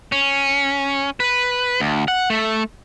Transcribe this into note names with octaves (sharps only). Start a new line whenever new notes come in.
C#4
B4
D2
F#5
A3